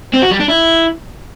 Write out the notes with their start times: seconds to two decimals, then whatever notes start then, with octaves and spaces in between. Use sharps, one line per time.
0.14 C4
0.23 F#4
0.31 G3
0.40 D4
0.49 E4